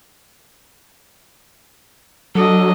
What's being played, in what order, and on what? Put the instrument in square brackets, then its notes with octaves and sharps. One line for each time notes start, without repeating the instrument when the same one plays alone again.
[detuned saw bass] F#3 [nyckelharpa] D4 D#5 [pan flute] A4